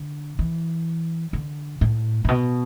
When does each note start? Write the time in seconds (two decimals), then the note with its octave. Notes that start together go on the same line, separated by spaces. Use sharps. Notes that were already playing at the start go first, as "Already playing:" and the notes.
Already playing: D3
0.39 E3
1.33 D3
1.81 A2
2.25 A2
2.28 B2